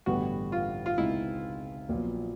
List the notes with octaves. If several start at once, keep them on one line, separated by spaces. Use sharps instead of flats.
A1 G2 D3 G3 B3 F#4
F4
F4
C#2 B2 G#3 C4 D#4 E4
A#1 A#2 F#3 B3